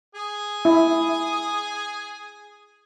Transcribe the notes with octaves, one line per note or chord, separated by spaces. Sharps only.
G#4 G#5 D#6
E4